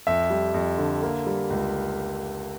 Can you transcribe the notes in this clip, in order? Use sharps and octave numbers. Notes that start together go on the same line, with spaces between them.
F2 E5
G3
F2
D3
A#3
G3
C#2